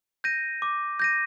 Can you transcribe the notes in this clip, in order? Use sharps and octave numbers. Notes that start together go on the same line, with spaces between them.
G6 A#6 D#7
D6
G6 A#6 D#7